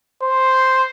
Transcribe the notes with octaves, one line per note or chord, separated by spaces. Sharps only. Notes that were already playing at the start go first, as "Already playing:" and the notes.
C5